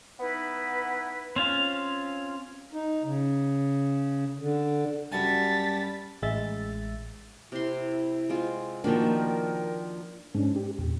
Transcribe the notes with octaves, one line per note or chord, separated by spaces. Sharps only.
B3 D#4 E4 B4
C4 C#4 F4 F5
D#4
C#3
D3
F#2 G3 G#5 A5 A6 B6
A1 G#3 E5 A6
C3 E4 C6
G#3 C4 F4
D#3 F3 A#3 D4 F#4 A#4 G5
G#2 C#4 D4
G4
E2 A#2